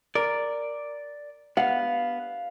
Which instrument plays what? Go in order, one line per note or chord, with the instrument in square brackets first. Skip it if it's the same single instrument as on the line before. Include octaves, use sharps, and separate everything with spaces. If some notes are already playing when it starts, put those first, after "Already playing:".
[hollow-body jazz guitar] A#4 [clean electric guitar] D5
[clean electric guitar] B3 [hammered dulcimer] F5 [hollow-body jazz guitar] F#5